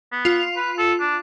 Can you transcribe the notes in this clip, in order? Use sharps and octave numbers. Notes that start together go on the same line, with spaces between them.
B3
F4
B4
A4
D4